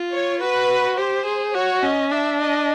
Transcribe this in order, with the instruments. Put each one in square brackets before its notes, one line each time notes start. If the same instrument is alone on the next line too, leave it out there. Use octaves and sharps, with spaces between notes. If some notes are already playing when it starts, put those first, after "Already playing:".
Already playing: [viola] F4
[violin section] C#5
[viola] F#4 [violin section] B4
[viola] G4 [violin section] C5
[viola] G#4
[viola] F#4 [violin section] C#5
[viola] C#4 [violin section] D#5
[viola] D4 [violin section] E5
[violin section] D#5